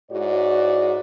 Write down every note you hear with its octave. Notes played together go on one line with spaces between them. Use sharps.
G#2 E4 F#4 C#5 D5